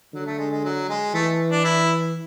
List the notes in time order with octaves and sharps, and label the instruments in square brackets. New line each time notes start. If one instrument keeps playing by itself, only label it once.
[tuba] D3 [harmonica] F#3
[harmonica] A3
G#3
G#3
F#3
G#3
[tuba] E3 [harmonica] A3
[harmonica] D4
E4